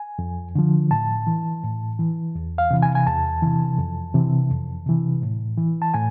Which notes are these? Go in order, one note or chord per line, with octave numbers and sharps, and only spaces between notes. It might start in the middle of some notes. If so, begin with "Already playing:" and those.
Already playing: G#5
F2
D3 F3
A2 A5
E3
A2
E3
E2
F5
C3 E3
G#5
G#5
E2 A5
C3 E3
F2
C3 E3
F2
C3 E3
A2
E3
A5
A2 G#5